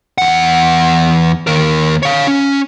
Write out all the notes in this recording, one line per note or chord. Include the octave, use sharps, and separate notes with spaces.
E2 F#5
D#2 A#4
C#5 F5
C#4